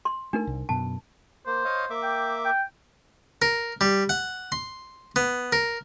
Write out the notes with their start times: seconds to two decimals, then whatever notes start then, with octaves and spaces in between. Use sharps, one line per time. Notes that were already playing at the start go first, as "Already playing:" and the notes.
0.05 C6
0.33 A3 D4 D#4 A#4
0.47 C2
0.69 F#2 B2 A5
1.46 A#3 C5
1.65 C#5 D#5 F5
1.90 A#3 E5 D6
2.03 G5
2.45 G5
3.42 A#4
3.81 G3
4.09 F#5
4.52 C6
5.16 B3
5.52 A#4